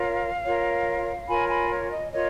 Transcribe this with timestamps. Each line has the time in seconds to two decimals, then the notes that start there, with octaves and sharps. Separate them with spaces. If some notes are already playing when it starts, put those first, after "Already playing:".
Already playing: F4 A#4 C#5 F5
0.45 F4 A#4 C#5
1.28 F4 A#4 C#5 G#5 B5
1.49 G#5 B5
1.70 C#5
1.91 D#5
2.12 F4 A#4 C#5 D#5